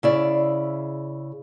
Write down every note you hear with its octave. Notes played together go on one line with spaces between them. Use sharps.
C#3 E4 D5